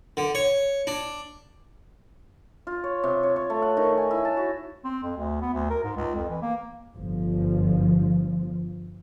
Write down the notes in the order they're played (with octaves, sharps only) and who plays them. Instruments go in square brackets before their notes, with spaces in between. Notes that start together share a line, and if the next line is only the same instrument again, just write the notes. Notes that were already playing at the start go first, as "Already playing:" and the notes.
[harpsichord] D3
C#5
D4
[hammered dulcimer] F4
C#5
C3
C#5
C#5
A3
F#5
D#3
G#5
E4
A5
F#4
[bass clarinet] C4
F2
D2
B3
D2
A#4
G#2
C#2
F2
E3
A#3
[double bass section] G1 F3